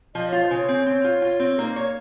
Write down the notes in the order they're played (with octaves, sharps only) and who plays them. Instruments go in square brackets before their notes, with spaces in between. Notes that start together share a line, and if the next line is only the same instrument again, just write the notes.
[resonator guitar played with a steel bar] F3 [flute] D#5
[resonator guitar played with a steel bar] F4 [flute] C#5
[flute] C5
[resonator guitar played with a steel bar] C#3
[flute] C#5
[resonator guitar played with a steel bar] C4
C4
F4
F4
C4
[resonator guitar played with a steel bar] A#3 [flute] D#4
[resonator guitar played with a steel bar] C#5